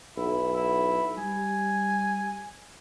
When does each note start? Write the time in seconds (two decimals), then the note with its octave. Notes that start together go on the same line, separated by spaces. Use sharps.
0.17 B1 E4
0.56 E4
1.18 G3 G#5